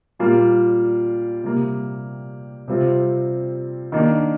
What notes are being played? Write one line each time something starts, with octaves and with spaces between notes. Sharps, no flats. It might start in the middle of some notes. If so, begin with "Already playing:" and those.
A#2 G3 A#3 F4
C3 G3 A#3
C3 G3 C4 F4
D#3 A#3 D4